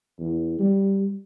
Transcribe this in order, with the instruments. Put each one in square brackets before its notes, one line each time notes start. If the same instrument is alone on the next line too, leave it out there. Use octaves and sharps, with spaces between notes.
[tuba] E2
G3